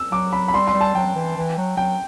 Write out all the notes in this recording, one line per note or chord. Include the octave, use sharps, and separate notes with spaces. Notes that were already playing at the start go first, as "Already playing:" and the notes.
Already playing: E6
F#3 D6
B5
B5
G3 C6
C6
G3
A5
F#3 G5
F#3
E3
E3
F#3
F#3 G5